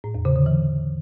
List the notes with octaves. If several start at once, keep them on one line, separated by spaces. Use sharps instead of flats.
A2
E2
C#3
D3
E3